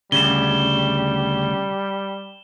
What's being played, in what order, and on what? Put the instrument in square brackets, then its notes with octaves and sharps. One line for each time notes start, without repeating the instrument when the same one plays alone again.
[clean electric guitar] D2 C#3 [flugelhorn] G3 [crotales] E7 G7